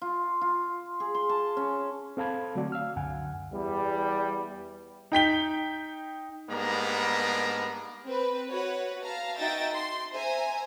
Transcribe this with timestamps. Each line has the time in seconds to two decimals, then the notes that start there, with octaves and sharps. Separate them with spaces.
0.02 F4
0.41 F4
1.00 G#4
1.15 C6
1.29 A5
1.57 C#4
2.17 C4 A4 F5 A5 B5 G#6
2.55 D3 F#3 A3 F#4 D5
2.72 F5 E6 F6
2.96 C#2 F#2 D3 F#5 G#5
3.54 E2 G3
5.12 D#4 G5 B6 G7
6.50 G#2 G3 A#3 B3 D4 A#5
8.07 C4 B4
8.51 F#4 B4 C#5
9.04 F5 A5 A#5
9.37 D#4 F#4 E5 G5 A6 A#6
9.72 C6
10.13 C5 E5 G#5 A#5